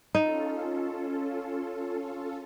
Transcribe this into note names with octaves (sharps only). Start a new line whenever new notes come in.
C#4 D#4 F4 A4